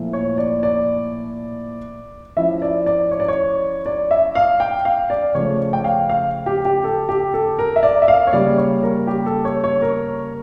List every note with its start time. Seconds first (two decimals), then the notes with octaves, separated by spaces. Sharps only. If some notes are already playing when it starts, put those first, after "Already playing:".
Already playing: A#2 F3 A3 E4
0.13 C#5
0.38 D5
0.63 D5
2.37 F3 C#4 E4 E5
2.62 D5
2.86 D5
3.11 C#5
3.20 D5
3.28 C#5
3.86 D5
4.11 E5
4.35 F5
4.60 G5
4.85 F5
5.10 D5
5.35 C#3 F3 A3 C#5
5.73 G5
5.84 F5
6.10 F5
6.46 G4
6.65 G4
6.84 A4
7.09 G4
7.34 A4
7.59 A#4
7.76 E5
7.83 D5
8.02 E5
8.08 F5
8.27 C#5
8.33 C#3 G3 A#3 D5
8.58 C#5
8.83 A#4
9.07 G4
9.26 A4
9.45 C#5
9.64 C#5
9.82 A#4